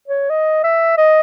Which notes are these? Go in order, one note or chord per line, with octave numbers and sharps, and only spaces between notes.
C#5
D#5
E5
D#5